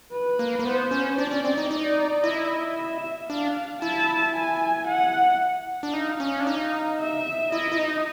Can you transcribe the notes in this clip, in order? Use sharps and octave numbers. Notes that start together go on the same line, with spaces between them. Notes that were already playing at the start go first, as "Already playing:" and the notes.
B4
A#3
A#3
B3 C5
C#4
D4 D5
C#4
C4
D#4
D#4 D5
E4 D#5
E5
D4 F5
E4 A5
G#5
F#5
D4
D#4 F5
C#4
D4
D#4
E5
E4 D#5
E4
D#4